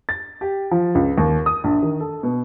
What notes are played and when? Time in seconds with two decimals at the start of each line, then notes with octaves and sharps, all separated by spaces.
0.09 A6
0.41 G4
0.71 F3
0.95 C#2
1.18 D#2
1.46 D#6
1.64 A#1
1.83 D#3
2.00 A4
2.23 B2